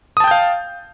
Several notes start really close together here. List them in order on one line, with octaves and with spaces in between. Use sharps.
D#6 A5 G5 G6 F5